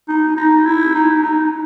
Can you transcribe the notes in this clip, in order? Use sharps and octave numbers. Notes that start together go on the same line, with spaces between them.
D#4
D#4
E4
D#4
D#4